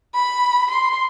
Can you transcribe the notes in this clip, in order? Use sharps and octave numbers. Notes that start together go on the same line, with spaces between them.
B5
C6